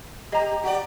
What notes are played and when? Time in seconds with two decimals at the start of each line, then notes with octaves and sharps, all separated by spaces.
0.32 G4 D#5 A#5
0.63 F#4 G4 D5